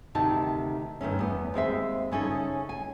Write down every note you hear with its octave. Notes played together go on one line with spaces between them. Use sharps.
D2 C3 D#3 D#4 A5
G2 D#3 A3 C#4
E2 B3
D#2 G#3 C4 E5
C#3 C#4 D#4 A4
G#5